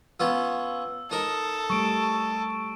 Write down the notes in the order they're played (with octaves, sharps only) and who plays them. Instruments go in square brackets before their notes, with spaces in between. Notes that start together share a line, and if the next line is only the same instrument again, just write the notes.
[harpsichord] B3 C#4 F4 [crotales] E6
[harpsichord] D#4 A#4 [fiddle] A4
[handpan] G3 A3 [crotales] C#6 D7